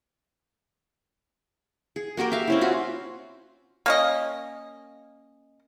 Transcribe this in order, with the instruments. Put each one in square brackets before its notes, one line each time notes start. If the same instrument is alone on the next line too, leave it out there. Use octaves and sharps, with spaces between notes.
[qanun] G#4
A#3 F#4 G4 A#4
E5 F5
C4 C#4 E4
F4 F#4
[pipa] A#3 C#4 D#5